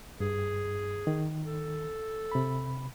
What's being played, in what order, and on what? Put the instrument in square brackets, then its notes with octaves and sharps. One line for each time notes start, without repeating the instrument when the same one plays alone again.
[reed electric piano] G2 [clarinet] G#4
[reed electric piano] D#3
[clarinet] A4
[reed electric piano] C3 B5